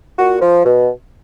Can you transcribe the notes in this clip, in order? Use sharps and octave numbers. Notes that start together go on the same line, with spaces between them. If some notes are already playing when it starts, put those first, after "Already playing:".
A#2 F#4
F3
B2